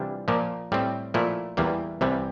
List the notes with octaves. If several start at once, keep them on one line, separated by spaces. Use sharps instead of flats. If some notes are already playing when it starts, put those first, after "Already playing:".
Already playing: C3 E3 G3 D4 F4
A#2 F3 A#3
A2 G3 C4
A#2 F3 A3 E4
E2 E3 G3 A#3
C2 C3 E3 G3